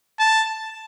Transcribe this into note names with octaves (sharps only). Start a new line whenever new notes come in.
A5